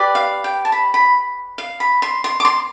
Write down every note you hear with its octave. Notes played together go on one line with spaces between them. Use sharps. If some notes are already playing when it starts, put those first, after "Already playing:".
Already playing: G4 B4 D5
F5
G5
A5
B5
B5
F5
B5
C6
C6
D6
C6